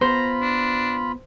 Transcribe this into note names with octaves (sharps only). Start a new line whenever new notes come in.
B3 F4 C5 A#5 B5
D4